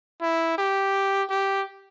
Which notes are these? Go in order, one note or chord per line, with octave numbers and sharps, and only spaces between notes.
E4
G4
G4